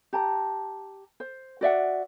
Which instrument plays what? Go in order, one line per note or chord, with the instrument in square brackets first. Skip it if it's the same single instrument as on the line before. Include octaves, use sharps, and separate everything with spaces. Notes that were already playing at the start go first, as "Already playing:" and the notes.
[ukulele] G4 A5 A#5
C5
F#4 D5 E5 F#5